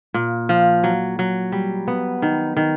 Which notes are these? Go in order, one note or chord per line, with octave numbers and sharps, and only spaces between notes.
A#2
F3
F#3
F#3
G3
B3
D#3
D#3